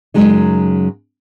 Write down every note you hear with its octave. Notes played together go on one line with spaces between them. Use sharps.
F#2 A#2 C#3 F#3 G#3 D#4